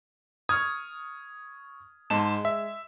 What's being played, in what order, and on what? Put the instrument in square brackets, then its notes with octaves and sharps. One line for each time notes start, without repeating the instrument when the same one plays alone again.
[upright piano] C#6 F6 G#6 [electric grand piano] D#6
[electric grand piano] G#2 A5 E7 [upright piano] G#3
[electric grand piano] E5